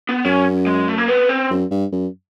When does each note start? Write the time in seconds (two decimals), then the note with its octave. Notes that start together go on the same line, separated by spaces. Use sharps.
0.09 B3
0.25 F#2 C#4
0.67 G#3
0.88 A3
0.98 A#3
1.08 B3
1.29 C4
1.50 F#2
1.71 G2
1.92 F#2